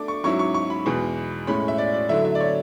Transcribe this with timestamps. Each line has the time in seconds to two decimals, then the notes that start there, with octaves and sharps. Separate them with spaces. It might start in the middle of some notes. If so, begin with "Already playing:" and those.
Already playing: A3 D4 D6
0.08 C#6
0.23 G#2 F#3 C#4 E4 C#6
0.39 C#6
0.54 C#6
0.70 B5
0.85 E2 B2 G#3
1.47 A2 G#3 C#4 B5
1.68 E5
1.78 D5
1.94 D5
2.09 D3 F#3 A3 E4 E5
2.25 E5
2.35 D5
2.40 C#5